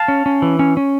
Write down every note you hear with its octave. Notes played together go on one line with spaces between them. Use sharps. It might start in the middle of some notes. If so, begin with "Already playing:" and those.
Already playing: F5 A5
C#4
C#4
E3
C#4
C#4